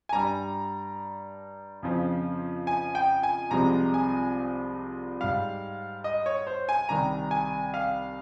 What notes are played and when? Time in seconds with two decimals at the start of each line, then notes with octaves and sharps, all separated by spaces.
0.09 G#5
0.12 G2 G3 A#5
1.83 F2 C#3 F3
2.67 G#5
2.95 G5
3.23 G#5
3.51 C2 C3 F3 G#3 A#5
3.94 G#5
5.21 G#2 G3 F5
6.04 D#5
6.26 C#5
6.47 C5
6.69 G#5
6.89 C2 C3 D#3 G3 A#5
7.31 G#5
7.74 F5